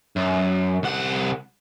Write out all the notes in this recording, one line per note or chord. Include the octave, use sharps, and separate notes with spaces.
F#2
C2 F#5